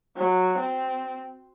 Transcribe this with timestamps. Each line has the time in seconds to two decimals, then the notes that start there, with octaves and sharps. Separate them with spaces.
0.17 F#3
0.58 C4